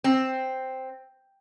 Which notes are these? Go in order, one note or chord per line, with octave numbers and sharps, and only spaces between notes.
C4